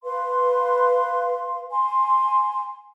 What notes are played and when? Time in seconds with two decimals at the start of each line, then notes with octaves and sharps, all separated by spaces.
0.04 B4 F5 C6
1.70 G#5 C6